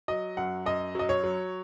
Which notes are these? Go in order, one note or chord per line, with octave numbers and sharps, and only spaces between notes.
F#3 D#5
F#2 F#5
F#2 D#5
F#3 D#5
C#5
F#3